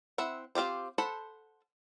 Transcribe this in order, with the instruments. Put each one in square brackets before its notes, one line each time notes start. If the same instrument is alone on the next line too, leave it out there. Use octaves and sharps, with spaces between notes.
[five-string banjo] C4 E4 E5 F#5
C4 F4 G4 C5
A4 C5 F#5 B5